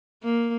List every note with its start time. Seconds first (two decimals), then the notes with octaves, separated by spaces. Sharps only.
0.23 A#3